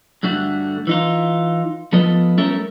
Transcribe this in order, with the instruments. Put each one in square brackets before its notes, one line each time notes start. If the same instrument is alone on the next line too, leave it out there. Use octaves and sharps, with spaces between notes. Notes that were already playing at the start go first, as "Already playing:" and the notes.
[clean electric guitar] G2 D3 A3 F#4
E3 D#4 F4
F3 B3 F4 A4 B4 D#5
G3 A3 C#4 A4 A#4 E5